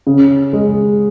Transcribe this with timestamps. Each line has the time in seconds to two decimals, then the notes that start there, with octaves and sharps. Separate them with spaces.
0.07 C#3
0.53 G#3